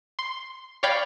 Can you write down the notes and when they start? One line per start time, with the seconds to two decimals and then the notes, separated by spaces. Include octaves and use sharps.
0.19 C6
0.83 C#5 D5 F5 G5 B5